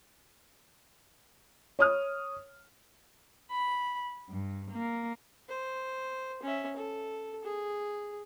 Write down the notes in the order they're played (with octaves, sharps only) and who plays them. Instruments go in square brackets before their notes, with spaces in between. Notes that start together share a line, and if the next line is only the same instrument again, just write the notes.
[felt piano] C#5 D#6 F6
[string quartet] B5
G2
A#3
[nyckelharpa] C5
C#4 E5
A4
G#4